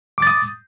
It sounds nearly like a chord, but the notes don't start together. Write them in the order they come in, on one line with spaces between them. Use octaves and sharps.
D6 A6 D#6